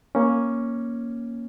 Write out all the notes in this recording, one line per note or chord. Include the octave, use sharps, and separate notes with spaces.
A#3 C#4